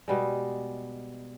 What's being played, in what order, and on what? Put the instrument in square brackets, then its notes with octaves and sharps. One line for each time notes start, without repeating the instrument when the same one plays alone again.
[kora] B2 G3 G#3